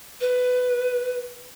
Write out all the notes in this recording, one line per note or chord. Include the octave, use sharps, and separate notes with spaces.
B4